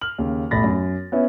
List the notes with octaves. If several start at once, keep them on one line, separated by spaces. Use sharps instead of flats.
F6 F#7
D#2 C#3
E1 A1 A3 B5 A6 A#6
F#2
B3 C#4 E4